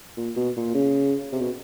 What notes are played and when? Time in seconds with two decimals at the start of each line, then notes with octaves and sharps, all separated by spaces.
0.17 A#2
0.36 B2
0.56 A#2
0.74 C#3
1.32 C3
1.41 B2